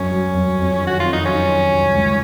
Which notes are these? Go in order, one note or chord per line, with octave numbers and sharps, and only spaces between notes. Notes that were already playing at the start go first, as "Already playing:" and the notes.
Already playing: F#2 C#4
F#3
F#2
F2
D#3
F#4
F2 F4
D#4
F#3 C#4
D#3
C2
C#2